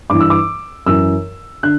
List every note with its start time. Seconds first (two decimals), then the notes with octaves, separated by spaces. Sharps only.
0.10 G2 E3 D6
0.20 E6
0.30 D6
0.86 F#2 E3 E6
1.63 D3 F#6